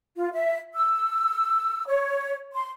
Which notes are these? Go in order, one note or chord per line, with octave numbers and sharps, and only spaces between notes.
F4
E5
E6
C#5
C6